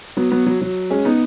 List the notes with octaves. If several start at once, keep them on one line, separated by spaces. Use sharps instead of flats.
F#3 B3
F#3 B3
F#3
F#3
G#3 C#4
B3 D#4